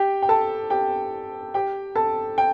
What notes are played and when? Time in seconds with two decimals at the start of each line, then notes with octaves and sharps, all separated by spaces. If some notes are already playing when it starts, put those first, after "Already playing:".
Already playing: G4 G5
0.22 G5
0.29 A4 A5
0.70 G4 G5
1.54 G4 G5
1.95 A4 A5
2.38 G5